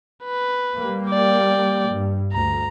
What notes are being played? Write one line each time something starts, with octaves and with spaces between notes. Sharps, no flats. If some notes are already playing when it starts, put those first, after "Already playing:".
B4
G3 A#3
D5 G5
G2
D2 A#5